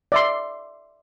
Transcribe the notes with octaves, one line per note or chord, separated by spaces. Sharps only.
D5 E5 C6